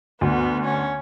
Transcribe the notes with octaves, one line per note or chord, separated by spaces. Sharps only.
D2 B3
C#4